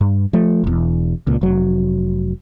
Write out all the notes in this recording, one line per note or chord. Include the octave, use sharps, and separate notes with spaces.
G2
F3 A3
E1 E2
C#2 A#2
F1 F#3